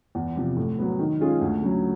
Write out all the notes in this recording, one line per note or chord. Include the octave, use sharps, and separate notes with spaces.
E2
C3 F3
A2
F#3 B3
D#3
G#3 C#4 F4 G#4
D2
C#3 F#3